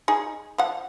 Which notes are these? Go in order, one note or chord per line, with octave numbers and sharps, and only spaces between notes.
D#4 G#4
F3 F#5